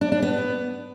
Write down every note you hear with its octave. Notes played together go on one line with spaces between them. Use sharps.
D4
D4
B3